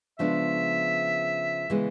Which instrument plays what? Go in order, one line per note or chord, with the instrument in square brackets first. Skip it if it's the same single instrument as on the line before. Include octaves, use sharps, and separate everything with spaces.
[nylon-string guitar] C#3 F3 G#3 B3 D4 [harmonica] E5
[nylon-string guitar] C#3 E3 G#3 B3